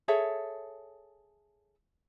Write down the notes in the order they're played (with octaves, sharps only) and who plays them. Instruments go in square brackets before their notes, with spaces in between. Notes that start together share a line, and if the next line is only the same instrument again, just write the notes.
[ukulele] G#4 A4 C#5 E5